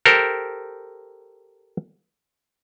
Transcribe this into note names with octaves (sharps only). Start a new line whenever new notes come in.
G4 A4 A#4 C5